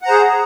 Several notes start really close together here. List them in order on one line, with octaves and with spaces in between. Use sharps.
F#5 A#5 C5 G#4